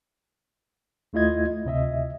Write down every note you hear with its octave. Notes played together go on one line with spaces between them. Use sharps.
D#2 A3 E4 F4 D#5 G#6
D2 C3 D#5 E5